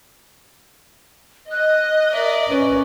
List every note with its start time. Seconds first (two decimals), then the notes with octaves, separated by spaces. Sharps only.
1.51 D#5 F#6
2.12 A#4 D5 E5
2.49 C#4 B4